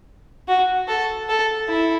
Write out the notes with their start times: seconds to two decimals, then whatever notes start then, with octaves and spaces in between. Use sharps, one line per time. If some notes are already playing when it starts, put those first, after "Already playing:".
0.48 F#4
0.88 A4
1.29 A4
1.68 E4